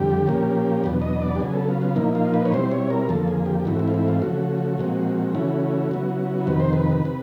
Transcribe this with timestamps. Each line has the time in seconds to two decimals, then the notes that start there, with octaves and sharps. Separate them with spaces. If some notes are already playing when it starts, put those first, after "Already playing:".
Already playing: F2 D3 G3 G4
0.27 A#2 F3 A#3 C#4
0.84 E2 B2 F#3 B3 D4
1.02 D#5
1.22 D5
1.35 G4
1.40 C#3 F#3 B3 G#4
1.53 A4
1.68 F4
1.82 F4
1.96 A#2 F3 A#3 D#4 E4
2.15 F4
2.34 B4
2.45 C#5
2.52 B2 G3 C4 E4 C5
2.71 C#5
2.90 A#4
3.09 F2 D3 F3 A#3 A4
3.28 G#4
3.46 G4
3.60 G4
3.65 G#2 E3 A3 C4 E4 F#4
3.79 E4
3.88 F4
3.94 E4
4.08 F4
4.22 C#3 F3 A3 F#4
4.78 A#2 F3 G#3 C4
5.34 C#3 E3 A3 C#4 E4 F#4
5.91 C#3 F#3 B3 E4
6.47 F2 C3 D#3 B4
6.60 C5
6.73 B4
7.05 C3